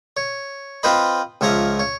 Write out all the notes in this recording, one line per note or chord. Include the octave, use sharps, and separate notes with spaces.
C#5
C4 F4 B4 C5 D#5 B5
C#2 F3 C#5 E5 A#5
C#5